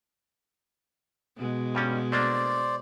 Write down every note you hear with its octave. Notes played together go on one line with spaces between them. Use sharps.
B2 G#3
G2 G3 C#4
A3 A#3 D4 C5 D5